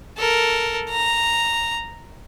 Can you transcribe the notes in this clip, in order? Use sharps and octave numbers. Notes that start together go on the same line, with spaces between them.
A4 A#4
A#5